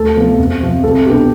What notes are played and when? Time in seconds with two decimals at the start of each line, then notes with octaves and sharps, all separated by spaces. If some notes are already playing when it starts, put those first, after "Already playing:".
Already playing: D2 A4
0.16 C3 F3 B3
0.39 F2
0.61 C3 F3
0.83 C2 A4
1.06 B2 B3 D4 G4